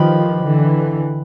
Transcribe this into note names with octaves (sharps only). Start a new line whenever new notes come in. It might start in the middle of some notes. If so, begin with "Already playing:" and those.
Already playing: D#3 F3 G4 B4 D#5
D3 E3